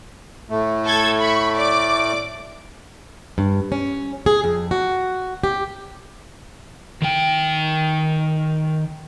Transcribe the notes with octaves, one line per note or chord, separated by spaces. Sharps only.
A2 A3
A4 G#6
B5 C#6
D5 D6
G2
C#4
G#4
F2
F#4
G4
D#3 G5